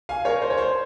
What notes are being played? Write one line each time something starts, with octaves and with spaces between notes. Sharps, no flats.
F5 G#5
A#4 C#5
C5
C#5
C5